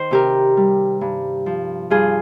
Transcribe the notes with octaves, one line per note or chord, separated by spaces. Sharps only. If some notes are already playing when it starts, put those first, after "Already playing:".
Already playing: D#3 C5
C3 G4 A#4
G3
G2
F3
G2 F4 G#4